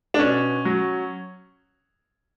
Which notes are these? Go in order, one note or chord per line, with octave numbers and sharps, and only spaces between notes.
D4
B2 C#4
F#3